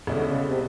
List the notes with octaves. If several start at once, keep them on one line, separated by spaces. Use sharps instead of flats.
C2 B2 D3 G#3 C#4 E4
C#3
C3